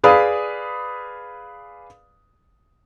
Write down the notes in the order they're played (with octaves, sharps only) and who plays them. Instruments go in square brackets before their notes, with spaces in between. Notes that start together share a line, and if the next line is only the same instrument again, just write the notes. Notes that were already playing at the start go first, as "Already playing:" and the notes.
[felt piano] G#4 B4 D5 F5 B5 D#6